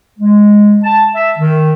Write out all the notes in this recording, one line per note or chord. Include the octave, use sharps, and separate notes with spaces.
G#3
A5
E5
D#3